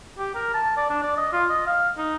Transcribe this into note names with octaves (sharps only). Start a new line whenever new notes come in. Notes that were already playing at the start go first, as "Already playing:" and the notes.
G4
A#4
A5
D5
D4
D5
D#5
F4
D#5
F5
D#4